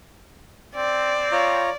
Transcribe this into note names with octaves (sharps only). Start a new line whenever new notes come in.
C4 D5
F4 C#5 A#5